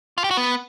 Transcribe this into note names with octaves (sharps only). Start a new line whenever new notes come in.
F4
G4
F#4
B3